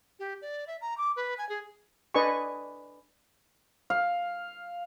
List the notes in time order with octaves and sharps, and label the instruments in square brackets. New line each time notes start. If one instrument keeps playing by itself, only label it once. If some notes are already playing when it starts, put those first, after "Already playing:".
[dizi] G4
D5
E5
A#5
D6
B4
G#5
G#4
[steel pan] D4 B4 D5 D#5 G#5 C#6
[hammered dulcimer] F5